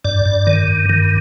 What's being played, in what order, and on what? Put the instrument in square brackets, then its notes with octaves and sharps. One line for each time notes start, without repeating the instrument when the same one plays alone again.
[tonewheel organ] G2 D5
G2
D#3
G2
D#3